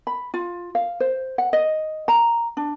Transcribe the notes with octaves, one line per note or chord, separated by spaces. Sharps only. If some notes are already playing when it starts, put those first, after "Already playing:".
B5
F4
F5
C5
F#5
D#5
A#5
D4